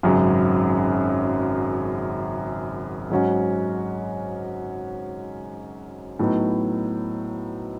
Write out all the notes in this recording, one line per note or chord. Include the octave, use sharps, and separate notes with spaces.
G#1 F#2 C#3 F#3
G#2 F#3 C#4 F#4
A2 F#3 B3 D#4